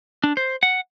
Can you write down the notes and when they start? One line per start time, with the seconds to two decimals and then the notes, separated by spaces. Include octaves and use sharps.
0.24 D4
0.37 C5
0.63 F#5